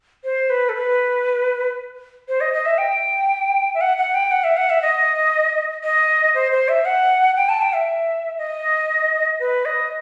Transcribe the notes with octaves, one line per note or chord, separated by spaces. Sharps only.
C5
B4
A4
B4
C5
D#5
D#5
E5
G5
E5
F#5
F#5
G5
F#5
E5
F#5
E5
D#5
D#5
C5
C5
E5
F#5
G5
A5
G5
E5
D#5
B4
D#5